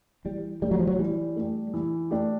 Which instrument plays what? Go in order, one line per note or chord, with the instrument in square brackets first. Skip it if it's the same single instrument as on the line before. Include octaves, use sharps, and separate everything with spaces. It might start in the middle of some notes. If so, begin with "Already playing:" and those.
[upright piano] E3 [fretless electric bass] G3
[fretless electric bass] G3 [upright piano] A3 D4 G4
[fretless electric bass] F#3
F3
F#3
[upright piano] E3 [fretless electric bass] G3
[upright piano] A3 D4 G4
E3
A3 D4 G4